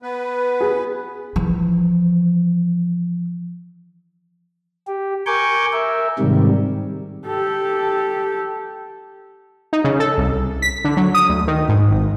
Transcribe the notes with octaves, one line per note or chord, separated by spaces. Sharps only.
B3 B4
G#4
E3 F3
G4
A#4 G#5 C#6 D6 G6
A#4 E5
G#2 C3 D#3 G3
G4 A4
D#4
C#3
A4
C2
B6
D3
F#3
D#6
D2
D#3
G#2
G#1